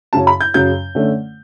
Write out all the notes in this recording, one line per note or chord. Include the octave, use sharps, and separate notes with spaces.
F#2 C#3 F#3 C#4 A5
B5
G6
F#2 C#3 F#3 C#4 G6
D3 A3 C#4